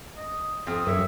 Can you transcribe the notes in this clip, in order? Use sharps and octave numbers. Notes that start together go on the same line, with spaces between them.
D#5
F2 D#6 F6
F#2 A#3 C#5 E5